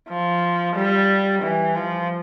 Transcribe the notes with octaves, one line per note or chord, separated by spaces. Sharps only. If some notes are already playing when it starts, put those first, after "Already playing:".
F3
G3
E3
F3